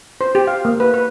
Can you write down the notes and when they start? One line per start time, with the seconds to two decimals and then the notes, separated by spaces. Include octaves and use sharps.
0.21 C5
0.35 G4
0.47 F5
0.65 A#3
0.80 B4
0.94 B4